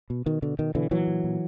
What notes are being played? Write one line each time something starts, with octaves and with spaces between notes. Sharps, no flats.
B2
B2 D#3
B2 D3
B2 D#3
B2 D3 E3
A#2 E3 F#3
A#2
A#2